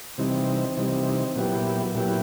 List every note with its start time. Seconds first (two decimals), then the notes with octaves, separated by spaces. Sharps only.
0.18 C3 E3 G3 C4 D#4
0.77 C3 E3 G3 C4 D#4
1.36 A#2 F#3 B3 E4 G4
1.95 A#2 F#3 B3 E4 G4